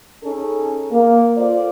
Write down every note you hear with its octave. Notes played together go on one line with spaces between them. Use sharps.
C#4 D#4 G#4 A4
A#3
F4 A4 C5 D5